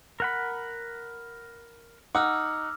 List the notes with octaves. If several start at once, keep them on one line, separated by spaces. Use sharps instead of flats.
A#4 F#5 B5
D#4 F#5 D6 E6 F6